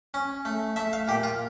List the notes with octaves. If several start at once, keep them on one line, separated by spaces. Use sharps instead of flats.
C#4
A3
A3 E5
F5
A#2 G4
F4